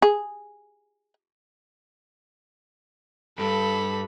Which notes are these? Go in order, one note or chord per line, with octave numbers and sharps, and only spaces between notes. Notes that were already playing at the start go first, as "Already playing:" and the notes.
G#4
G2 A4 B5